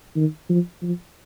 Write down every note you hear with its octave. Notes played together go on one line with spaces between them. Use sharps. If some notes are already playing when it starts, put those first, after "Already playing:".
D#3
F3
F3